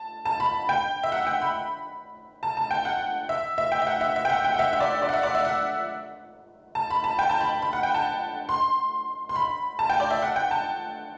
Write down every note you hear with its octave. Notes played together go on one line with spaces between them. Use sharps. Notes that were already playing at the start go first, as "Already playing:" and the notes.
Already playing: A5
A5
B5
G5
E5
F#5
G5
B5
A5
A5
G5
F#5
E5
E5
G5
E5
F#5
E5
E5
G5
F#5
G5
F#5
E5
E5
D5
D5
F#5
E5
D5
E5
F#5
A5
B5
A5
G5
A5
B5
B5
F#5
G5
A5
C6
C6
B5
A5
G5
D5
E5
F#5
G5
A5